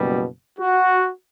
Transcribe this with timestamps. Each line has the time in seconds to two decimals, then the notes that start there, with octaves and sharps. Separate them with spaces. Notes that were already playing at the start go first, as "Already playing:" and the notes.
Already playing: F#1 B2 G3
0.59 F#4